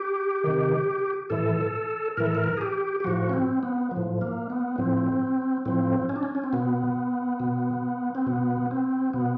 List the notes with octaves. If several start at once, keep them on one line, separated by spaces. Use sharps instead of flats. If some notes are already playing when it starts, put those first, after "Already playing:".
Already playing: G4
C3 D#3
A2 E3 A4
A2 E3 A#4
A4
A#4
G#4
G4
G4
A2 F3 F#4
C#4
C4
B3
F3
A2
A#3
B3
A2 F3 C4
A2 F3 C4
C#4
D4
C#4
C#4
C4
B2 B3
B2
C4
B2 B3
C4
B2 B3